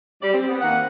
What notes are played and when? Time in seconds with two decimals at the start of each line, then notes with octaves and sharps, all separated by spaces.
0.22 G3 D5
0.33 C4
0.48 B3
0.61 D#3 A#3 C4 F#5